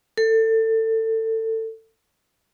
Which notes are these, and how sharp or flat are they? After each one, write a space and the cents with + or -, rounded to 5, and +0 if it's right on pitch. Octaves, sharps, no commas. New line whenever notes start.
A4 +25